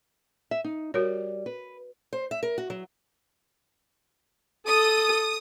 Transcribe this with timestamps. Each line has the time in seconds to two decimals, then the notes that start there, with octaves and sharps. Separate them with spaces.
0.51 E5
0.64 D#4
0.94 G3 F#4 A#4 C#5
1.46 B4
2.13 C5
2.31 E5
2.43 A#4
2.58 F#4
2.70 F#3
4.67 A4 D#6